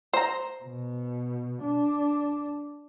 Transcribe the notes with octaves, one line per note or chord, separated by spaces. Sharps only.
C5 A#5
B2
D4